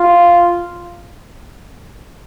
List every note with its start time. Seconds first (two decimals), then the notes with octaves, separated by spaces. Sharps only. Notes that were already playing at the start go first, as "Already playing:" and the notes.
Already playing: F4